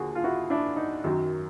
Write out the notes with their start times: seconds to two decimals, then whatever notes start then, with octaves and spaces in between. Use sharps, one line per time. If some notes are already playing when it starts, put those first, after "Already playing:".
Already playing: D#2 D3 F3 F#4 G#4
0.15 F4
0.24 E4 F#4
0.50 D4 E4
0.76 D#4
1.04 F#2 D#3 F#3